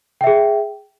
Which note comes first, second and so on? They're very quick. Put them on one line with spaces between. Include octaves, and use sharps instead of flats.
G5 E5 G#4